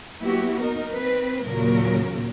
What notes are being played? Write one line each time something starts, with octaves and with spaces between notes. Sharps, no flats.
F#3 A#3 B3 E4 F#4 G4
D#4 A#4
C4 B4
D#2 A#2 C#3 F#3 A#4